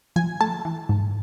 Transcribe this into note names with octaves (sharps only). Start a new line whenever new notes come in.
F3 G#5
A3 A5
E3
G#2